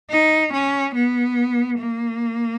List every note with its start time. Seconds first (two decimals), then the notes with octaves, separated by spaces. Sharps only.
0.10 D#4
0.52 C#4
0.94 B3
1.78 A#3